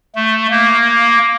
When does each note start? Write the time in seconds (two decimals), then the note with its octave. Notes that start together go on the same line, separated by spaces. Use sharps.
0.15 A3
0.51 A#3